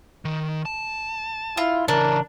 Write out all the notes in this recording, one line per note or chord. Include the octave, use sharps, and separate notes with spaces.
D#3
A5
E4 F4
C#3 E3 D4 A#4